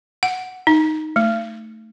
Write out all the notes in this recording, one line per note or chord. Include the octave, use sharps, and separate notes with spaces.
F#5
D#4
A3